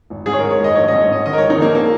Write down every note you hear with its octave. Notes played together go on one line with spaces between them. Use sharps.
G#1
G#2 G#4
C#5
G#2 A#4
C#5
G#1 D#5
A#1 C#5
G#2 D#5
C#5
G#2 D#5
D#3 D#5
A#4
A#1 C#5
D#4
A#1 A#3
F3 A#3